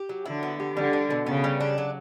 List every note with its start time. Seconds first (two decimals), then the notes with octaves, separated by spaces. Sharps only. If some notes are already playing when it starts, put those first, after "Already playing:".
Already playing: G4
0.09 F#3
0.26 D3 E4
0.43 B3
0.60 G4
0.76 D3 G3
0.93 D4
1.10 B2
1.26 C#3 B3
1.44 G3
1.60 D4
1.78 F#3